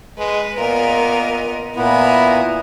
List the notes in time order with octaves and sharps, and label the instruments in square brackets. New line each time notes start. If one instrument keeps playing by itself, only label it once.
[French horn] G#3 [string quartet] B4
[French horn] A#2 [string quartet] B3 A#4 D#5
[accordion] A#2 B3 [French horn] E4 [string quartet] G#5 A#5